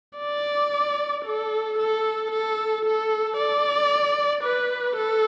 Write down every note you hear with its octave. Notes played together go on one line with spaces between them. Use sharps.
D5
A4
A4
A4
A4
D5
B4
A4